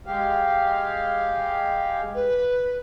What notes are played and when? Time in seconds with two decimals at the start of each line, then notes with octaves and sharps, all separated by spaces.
0.06 G#3 G4 F5
2.14 B4